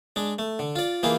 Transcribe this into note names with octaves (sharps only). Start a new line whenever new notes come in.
G#3 D4
A3
D3
F4 D5
E3 A#3 F4 G4 G#4